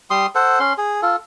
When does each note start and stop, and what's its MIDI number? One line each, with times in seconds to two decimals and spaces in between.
0.10 0.26 55
0.10 0.26 84
0.10 0.26 87
0.35 0.59 69
0.35 0.59 72
0.35 0.59 78
0.60 0.73 61
0.60 0.73 84
0.78 1.01 68
1.02 1.16 65
1.02 1.16 69